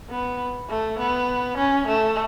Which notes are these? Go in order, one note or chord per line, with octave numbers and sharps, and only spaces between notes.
B3
A3
B3
C#4
A3